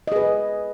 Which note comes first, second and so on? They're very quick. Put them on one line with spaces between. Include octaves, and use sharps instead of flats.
D#5 G#4 B4